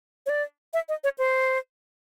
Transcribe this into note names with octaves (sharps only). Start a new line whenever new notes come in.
C#5
D5
E5
D#5
C#5
C5